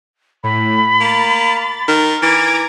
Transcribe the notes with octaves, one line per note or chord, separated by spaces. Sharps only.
A2 B5
A#3 A6
D#3
E3 A#5 D6 G#6 D7